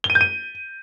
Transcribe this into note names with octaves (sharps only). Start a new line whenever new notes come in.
G7
D#7
G6
D#7